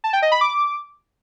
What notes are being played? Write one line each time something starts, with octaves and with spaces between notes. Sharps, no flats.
A5
G5
D#5
B5
D6